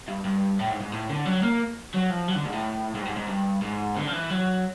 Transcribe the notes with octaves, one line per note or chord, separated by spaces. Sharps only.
G2
G2
A2
G#2
G#2
A2
D3
F#3
A#3
F#3
F3
F#3
D3
G#2
A2
G#2
G2
G#2
G#2
G2
G#2
D3
F3
E3
F#3